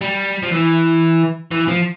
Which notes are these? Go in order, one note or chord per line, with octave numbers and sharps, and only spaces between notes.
G3
F3
E3
E3
F3